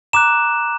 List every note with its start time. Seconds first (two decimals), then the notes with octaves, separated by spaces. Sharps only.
0.13 A#5 D6 F#6 E7